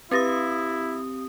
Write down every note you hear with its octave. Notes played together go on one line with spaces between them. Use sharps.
C4 E4 G4 B4 D#6 A6 A#6